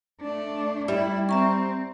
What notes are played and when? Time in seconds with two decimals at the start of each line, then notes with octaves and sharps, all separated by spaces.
0.21 A3 D4
0.88 G3 E4 E5
1.29 C4 E5 A#5 C#6